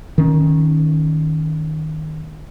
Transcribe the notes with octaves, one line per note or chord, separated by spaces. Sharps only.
D#3 C#4